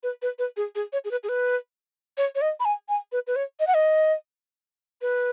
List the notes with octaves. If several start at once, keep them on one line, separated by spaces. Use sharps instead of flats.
B4
B4
B4
G#4
G#4
C#5
G#4
B4
G#4
B4
C#5
C#5
D#5
B5
G#5
G#5
B4
B4
C#5
D#5
F#5
D#5
B4